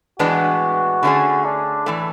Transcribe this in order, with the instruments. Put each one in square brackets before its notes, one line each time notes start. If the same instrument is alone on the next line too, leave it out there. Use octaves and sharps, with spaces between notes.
[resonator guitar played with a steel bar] A2 E3 G#3 B3 D4 [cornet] F#4
[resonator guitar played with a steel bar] D3 A3 C#4 G#4
[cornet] D4
[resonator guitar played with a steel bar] A2 E3 A3